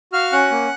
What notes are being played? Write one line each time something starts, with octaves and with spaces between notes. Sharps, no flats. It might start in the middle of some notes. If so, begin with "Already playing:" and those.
F#4 F5 F6
C#4 F#5 F#6
A#3